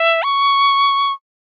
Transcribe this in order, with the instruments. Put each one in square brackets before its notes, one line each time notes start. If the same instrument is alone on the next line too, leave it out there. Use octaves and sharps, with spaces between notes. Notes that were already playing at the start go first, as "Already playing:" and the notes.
Already playing: [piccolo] E5
C#6